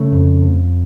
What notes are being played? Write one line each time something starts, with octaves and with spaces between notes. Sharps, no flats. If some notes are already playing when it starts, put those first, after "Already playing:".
Already playing: C#3 A3
F2
F2